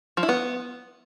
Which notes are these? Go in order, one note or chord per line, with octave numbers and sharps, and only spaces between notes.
F3
E4
B3